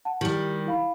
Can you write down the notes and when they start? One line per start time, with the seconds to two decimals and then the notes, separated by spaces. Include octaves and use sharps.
0.05 F#5 A5
0.21 D#3 G3 E4 G4 F#7
0.66 E4 F5 B5